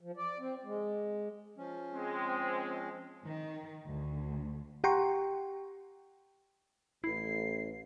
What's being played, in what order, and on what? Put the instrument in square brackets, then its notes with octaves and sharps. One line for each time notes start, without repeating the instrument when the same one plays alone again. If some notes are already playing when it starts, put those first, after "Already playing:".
[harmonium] F3
D5
C4
G#3
F3 C#4
[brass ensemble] G#3 C4
[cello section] D#3
D2
[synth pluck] G4 F#5 G5 A#5 C6 C#6
[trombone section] A1 [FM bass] E4 [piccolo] C7